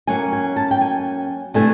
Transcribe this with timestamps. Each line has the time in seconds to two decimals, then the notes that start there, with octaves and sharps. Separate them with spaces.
0.07 F#3 A#3 C#4 G#5
0.33 G#5
0.56 A5
0.71 G5
0.81 G#5
1.54 C3 E3 A3 D4 G#5